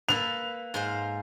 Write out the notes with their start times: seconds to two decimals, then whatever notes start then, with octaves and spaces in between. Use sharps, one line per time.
0.09 A#3 A4 B4 F7
0.74 G#2 C5 F5